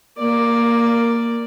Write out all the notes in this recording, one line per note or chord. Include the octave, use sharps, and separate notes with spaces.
A#3 D5